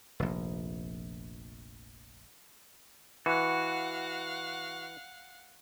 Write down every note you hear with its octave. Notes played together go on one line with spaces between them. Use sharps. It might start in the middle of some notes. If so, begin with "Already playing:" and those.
F1 A#1
E3 F#4 F5 F#5